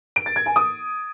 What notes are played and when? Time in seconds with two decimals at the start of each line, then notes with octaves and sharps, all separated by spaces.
0.16 D7
0.26 A6
0.36 G#6
0.46 G#5
0.56 D#6